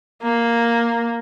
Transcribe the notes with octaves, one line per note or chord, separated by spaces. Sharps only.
A#3